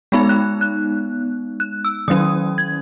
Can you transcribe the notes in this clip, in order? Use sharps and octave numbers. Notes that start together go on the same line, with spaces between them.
G#3 B3 D#4 B5
F#6
F#6
F#6
E6
D#3 F#3 C#4 D#6
G#6